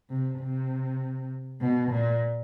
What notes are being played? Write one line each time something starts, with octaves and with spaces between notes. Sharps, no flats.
C3
C3
B2
A#2